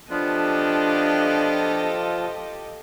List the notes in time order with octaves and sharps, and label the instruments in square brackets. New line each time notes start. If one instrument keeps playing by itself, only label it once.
[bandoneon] F3 F4 [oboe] B3 [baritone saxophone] D4 [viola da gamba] G4 A4 D#5